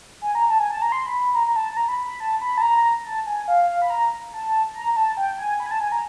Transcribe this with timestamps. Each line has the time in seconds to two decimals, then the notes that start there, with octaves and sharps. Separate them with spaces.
0.22 G#5
0.35 A#5
0.50 A5
0.60 G#5
0.71 A5
0.82 A#5
0.92 C6
1.06 B5
1.20 B5
1.35 A#5
1.46 A#5
1.56 A5
1.72 A5
1.77 A#5
1.88 B5
1.99 B5
2.09 B5
2.20 A5
2.42 B5
2.58 A5
2.62 A#5
3.04 A5
3.27 G#5
3.48 F5
3.82 B5
3.90 A#5
4.33 A5
4.74 A#5
4.96 A5
5.17 G5
5.39 G#5
5.60 B5
5.66 G#5
5.71 A5
5.81 G#5
5.92 A#5